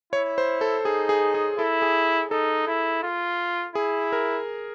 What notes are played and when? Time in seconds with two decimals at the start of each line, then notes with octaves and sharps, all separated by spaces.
0.13 E4 C#5
0.38 C5
0.61 A4
0.85 D#4 G#4
1.09 G#4
1.34 G#4
1.58 E4 A4
1.82 G#4
2.31 D#4 A4
2.67 E4
3.03 F4
3.75 E4 G#4
4.12 A#4